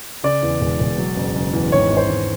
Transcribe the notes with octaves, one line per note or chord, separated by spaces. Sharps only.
C#3 D5
E2
E1
E1
F#3
F#1
F#1
E2
G#1 C#5
G#1
C5
G#1